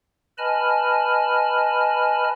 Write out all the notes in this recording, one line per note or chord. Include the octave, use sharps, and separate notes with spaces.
B4 D#5 G#5 A5 B5 F6